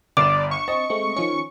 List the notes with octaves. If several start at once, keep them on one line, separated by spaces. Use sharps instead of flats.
G1 D5 C6 D6 D#6 F6 E7
C#6
C4 D#5 A5
G#3 A3 C4
D#3 F3 C#4 C#6